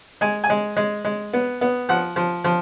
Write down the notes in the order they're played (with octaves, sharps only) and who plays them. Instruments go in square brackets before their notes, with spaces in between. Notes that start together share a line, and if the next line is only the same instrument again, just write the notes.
[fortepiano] G#3 G#5
G#5
G#3
G#3
G#3
B3
B3
F3 F#5
F3
F3